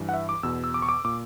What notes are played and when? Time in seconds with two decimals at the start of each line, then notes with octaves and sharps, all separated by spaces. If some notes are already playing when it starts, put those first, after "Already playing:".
Already playing: G2 E3
0.09 F#5
0.13 E5
0.29 D6
0.43 E2 B2 E6
0.64 E6
0.74 D6
0.82 C#6
0.89 D6
1.05 A#2 D6